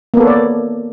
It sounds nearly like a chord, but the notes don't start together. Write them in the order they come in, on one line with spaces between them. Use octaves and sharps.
A#3 B3 A4 C#5 D5